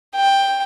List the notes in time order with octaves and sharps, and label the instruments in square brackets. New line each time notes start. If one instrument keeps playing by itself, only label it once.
[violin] G5